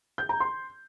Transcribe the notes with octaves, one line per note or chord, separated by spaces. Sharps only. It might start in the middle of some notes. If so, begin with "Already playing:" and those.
G6
A#5
C6